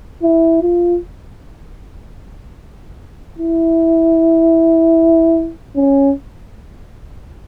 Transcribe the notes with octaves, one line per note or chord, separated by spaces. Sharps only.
E4
F4
E4
C#4